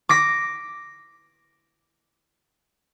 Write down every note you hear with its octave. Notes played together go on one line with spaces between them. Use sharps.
D6 A#6 B6